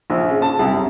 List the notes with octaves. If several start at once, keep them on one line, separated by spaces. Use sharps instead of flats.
A#1
C#3
A5
C2
F#2